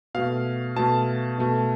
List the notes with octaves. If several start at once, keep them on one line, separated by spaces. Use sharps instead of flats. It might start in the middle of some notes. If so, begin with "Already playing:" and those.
B2 A3 F5
B2 A3 A5
B2 A3